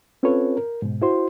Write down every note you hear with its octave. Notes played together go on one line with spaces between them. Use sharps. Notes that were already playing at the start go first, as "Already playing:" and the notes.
C4 C#4 F4 A4 B4 C#5
A#4
G#2 B2
E4 F#4 C5 C6